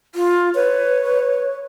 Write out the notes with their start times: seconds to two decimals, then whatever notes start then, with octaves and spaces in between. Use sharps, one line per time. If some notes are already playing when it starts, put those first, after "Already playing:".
0.15 F4
0.55 B4 C#5
1.03 B4